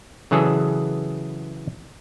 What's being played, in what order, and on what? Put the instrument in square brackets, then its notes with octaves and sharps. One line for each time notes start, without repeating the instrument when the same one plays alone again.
[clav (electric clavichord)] C#3 E3 F#3 G#4 A4